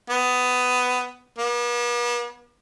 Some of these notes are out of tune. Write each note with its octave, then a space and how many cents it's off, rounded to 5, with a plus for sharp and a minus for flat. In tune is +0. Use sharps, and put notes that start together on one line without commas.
B3 +15
B3 -45